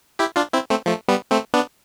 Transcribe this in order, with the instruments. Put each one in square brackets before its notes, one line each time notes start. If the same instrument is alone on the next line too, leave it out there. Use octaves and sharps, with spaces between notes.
[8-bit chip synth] E4 G4
D4 F4
C4 E4
A3 C4
F3 A3
G3 B3
A3 C4
B3 D4